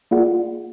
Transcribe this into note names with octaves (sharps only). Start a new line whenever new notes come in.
A#3 F4 G#4 D5 F#5